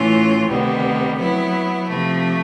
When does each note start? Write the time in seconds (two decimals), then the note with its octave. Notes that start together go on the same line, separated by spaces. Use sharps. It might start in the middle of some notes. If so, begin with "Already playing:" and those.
Already playing: A2 E3 A3 C#4 F4
0.48 D2 C3 D#3 G3 B3
1.17 F#3 B3 E4
1.87 C3 F3 A3